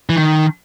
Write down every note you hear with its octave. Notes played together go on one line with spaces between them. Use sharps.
E3
D#3